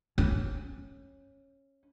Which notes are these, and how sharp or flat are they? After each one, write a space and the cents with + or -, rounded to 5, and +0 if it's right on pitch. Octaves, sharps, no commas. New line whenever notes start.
C#4 -15